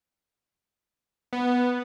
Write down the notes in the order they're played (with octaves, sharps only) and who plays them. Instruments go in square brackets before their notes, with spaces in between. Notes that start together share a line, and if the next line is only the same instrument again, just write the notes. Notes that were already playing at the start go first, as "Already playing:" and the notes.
[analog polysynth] B3